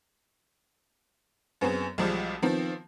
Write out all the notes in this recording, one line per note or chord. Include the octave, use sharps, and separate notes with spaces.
F#2 B3 C4 G#4 E7
B1 F3 G3 G#3
D#3 F3 B3 C4